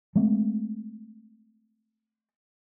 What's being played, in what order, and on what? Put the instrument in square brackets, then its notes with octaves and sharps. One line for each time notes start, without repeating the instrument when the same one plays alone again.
[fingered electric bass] G#3 A3 C4